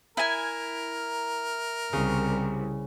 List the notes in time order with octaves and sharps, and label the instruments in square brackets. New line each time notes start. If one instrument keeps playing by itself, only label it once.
[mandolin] E4 G#5 [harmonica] A#4
[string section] C2 [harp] C#3